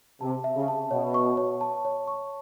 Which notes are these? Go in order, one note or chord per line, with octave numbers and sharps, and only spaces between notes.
C3 A5
E5
C#3
A5
B2 C#5
C#6
C#5
A5
C#5
C#6